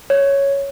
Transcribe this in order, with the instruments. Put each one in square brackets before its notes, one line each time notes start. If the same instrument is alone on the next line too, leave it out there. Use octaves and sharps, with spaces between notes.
[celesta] C#5